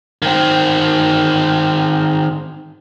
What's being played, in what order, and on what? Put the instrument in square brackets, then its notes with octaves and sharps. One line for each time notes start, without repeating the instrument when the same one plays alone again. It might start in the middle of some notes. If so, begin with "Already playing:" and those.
[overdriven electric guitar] D#3 C4